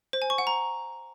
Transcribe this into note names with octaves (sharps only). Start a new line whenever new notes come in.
C5
G#5
C#6
F#5
A#5